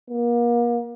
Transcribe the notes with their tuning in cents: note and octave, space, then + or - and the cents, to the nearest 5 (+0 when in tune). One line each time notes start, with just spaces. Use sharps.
A#3 +35